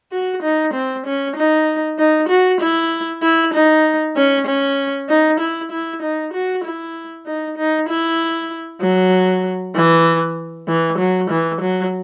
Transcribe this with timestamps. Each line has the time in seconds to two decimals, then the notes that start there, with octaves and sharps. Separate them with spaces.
0.12 F#4
0.43 D#4
0.74 C4
1.06 C#4
1.36 D#4
1.98 D#4
2.29 F#4
2.61 E4
3.22 E4
3.54 D#4
4.16 C#4
4.47 C#4
5.09 D#4
5.40 E4
5.72 E4
6.02 D#4
6.33 F#4
6.64 E4
7.26 D#4
7.57 D#4
7.89 E4
8.81 F#3
9.75 E3
10.68 E3
10.99 F#3
11.30 E3
11.61 F#3